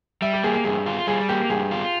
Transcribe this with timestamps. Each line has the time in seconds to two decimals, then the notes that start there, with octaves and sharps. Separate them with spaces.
0.22 G3 E5
0.33 G4
0.44 A#3 G#4
0.54 G#4
0.65 G2 G#4
0.86 F4
1.07 G3 G#4
1.29 A#3 G4
1.50 G2 G#4
1.71 F4